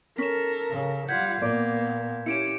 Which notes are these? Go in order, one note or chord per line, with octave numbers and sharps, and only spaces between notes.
C#4 A4 A#4 B6 E7
C#3
G3 F4 F#5 G6 G#6 B6
A#2 A#3 B3 D5
C#4 E4 G4 C#7 D7 E7